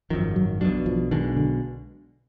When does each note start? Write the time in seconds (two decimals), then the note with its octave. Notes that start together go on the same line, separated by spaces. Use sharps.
0.10 D#3 F3
0.13 G#1 F#2
0.36 F#3
0.61 B1 B2 F#3 G#3 D4
0.86 F3
1.11 B1 B2 D#3 G#3 D4
1.37 D3